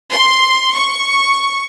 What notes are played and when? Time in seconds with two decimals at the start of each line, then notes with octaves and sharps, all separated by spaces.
0.10 C6
0.74 C#6